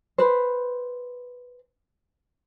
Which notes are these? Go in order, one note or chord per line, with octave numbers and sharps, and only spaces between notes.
B4 C5